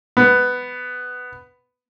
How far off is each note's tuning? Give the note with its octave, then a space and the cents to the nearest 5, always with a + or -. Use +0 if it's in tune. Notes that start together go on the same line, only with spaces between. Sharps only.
B3 +10